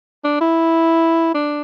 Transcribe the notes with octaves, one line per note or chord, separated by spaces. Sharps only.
D4
E4
D4